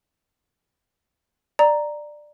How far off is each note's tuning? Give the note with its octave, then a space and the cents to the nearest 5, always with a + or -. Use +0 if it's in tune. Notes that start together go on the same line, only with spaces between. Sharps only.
D5 +15 A#5 +0